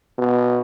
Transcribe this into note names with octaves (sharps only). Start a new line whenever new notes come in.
B2